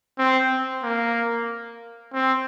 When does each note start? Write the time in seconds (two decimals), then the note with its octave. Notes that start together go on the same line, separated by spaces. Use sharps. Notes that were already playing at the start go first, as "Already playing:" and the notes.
0.18 C4
0.83 A#3
2.13 C4